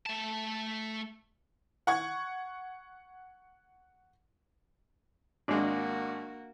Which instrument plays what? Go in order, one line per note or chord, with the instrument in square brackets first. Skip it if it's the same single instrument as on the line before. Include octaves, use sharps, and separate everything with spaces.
[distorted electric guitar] A3 A5
[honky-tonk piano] F#5 C#6 G#6
[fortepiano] G#1 G#3 [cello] A#3 F#4 [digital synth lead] D4